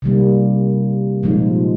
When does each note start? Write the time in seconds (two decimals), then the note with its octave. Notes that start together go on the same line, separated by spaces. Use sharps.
0.02 C3 D#3 G3 A#3
1.23 A#2 F3 G#3 D#4